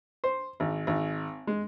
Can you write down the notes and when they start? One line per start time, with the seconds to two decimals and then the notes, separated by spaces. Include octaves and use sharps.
0.24 C5
0.60 G#1
0.87 G#1
1.47 G#3